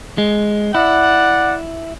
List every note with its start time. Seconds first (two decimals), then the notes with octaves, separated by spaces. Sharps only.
0.18 G#3
0.75 E4 D5 F#5